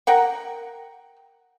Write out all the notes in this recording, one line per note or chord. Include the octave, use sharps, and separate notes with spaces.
A#4 F#5 G5